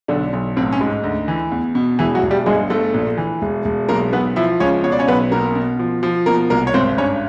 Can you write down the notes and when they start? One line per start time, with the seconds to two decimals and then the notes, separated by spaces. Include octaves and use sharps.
0.08 B1 D3 D4
0.33 B1
0.56 A1 C4
0.72 C#4
0.81 G#2
1.03 D2
1.28 E3
1.52 E2
1.75 B2
1.99 E1 E3 E4
2.15 F#3 F#4
2.23 E1
2.31 G3 G4
2.46 G1 G#3 G#4
2.70 G1 A3 A4
2.94 A#1
3.18 E3
3.42 E1
3.65 E1
3.89 B1 A#3 A#4
4.13 B1 B3 B4
4.36 F3 E4 E5
4.60 C#2 C#4 C#5
4.84 B2 C#5
4.92 D5
4.99 C#4 C#5
5.08 B1 B3 B4
5.31 B2 A#3 A#4
5.55 B2
5.79 F3
6.03 F3
6.26 B2 A#3 A#4
6.50 C2 A#3 A#4
6.67 C#5
6.74 G#1 C4 C5
6.98 G2 C#4 C#5